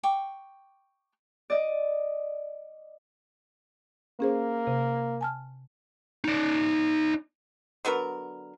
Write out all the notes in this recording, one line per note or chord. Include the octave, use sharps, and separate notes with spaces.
G5 C#6 D6
D5 D#5
A#3 C#4 G#4 C5
C3
G#5 A5 F6
D#4 D5
D3 F#3 B3 A#4